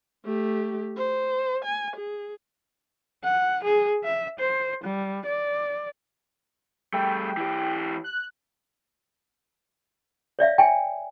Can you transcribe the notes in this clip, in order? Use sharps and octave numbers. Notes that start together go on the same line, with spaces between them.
A3 G4
C5
G#5
G#4
F#5
G#4
E5
C5
G3
D5
G3 A3 G5
E3 G4
F#6
C#5 D5 E5 F5
G5 G#5